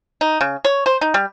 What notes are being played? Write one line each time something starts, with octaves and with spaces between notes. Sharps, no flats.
D#4
C#3
C#5
C5
D#4
G3